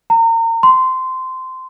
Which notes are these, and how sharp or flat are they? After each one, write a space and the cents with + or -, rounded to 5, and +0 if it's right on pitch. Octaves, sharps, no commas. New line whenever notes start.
A#5 -35
C6 -15